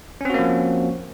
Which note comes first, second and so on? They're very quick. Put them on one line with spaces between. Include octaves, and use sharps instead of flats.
C#4 C4 F#4 A#3 F3